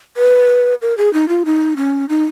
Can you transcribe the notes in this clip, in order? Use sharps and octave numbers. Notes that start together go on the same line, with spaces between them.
B4
A#4
G#4
D#4
F4
D#4
C#4
D#4